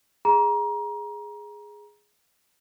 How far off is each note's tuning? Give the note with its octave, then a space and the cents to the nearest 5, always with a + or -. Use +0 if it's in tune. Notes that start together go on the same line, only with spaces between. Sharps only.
G#4 +0 A#5 +25